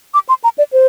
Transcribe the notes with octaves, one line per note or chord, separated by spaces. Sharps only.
D6
C6
A#5
D5
C5